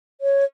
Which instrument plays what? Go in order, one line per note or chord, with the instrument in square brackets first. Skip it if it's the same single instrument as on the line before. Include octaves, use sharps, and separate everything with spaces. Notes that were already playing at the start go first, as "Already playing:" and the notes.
[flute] C#5